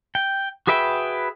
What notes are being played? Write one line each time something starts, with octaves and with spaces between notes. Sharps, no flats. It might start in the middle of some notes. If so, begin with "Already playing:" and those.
G5
F#4 G#4 B4 E5 G5